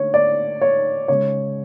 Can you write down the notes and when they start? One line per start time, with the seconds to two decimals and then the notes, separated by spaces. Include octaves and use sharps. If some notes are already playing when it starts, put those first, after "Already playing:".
Already playing: D3 A3 C#5
0.14 D5
0.61 C#5
1.08 C#3 G#3 C#5